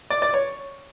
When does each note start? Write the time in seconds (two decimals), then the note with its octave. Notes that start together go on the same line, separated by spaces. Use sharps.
0.10 D5
0.22 D5
0.34 C#5